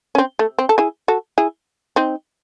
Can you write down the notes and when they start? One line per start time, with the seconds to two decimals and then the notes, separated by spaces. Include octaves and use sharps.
0.15 C#4
0.18 C4
0.39 A3
0.59 C4
0.69 A4
0.78 E4 G#4
1.08 F#4 A4
1.38 E4 G#4
1.96 C4 D#4